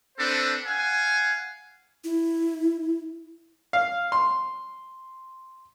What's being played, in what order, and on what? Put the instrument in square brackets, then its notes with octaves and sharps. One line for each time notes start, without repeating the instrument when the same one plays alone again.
[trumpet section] C4 D4 A4 B4 C5
F5 F#5 G#5
[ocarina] E4
[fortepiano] F5
C6